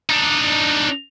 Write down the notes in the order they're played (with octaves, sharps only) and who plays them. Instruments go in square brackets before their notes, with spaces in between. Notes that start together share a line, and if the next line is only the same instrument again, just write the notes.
[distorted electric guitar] D4 D#4